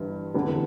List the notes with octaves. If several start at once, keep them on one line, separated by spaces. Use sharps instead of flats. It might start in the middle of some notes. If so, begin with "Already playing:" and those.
Already playing: G1 G2 E3
F1 E2 D3